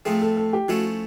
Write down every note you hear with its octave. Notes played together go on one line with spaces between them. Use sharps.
A2 F3 A3 C4 G#4
A4
A4
G4
F3 A3 C#4 E4 F#4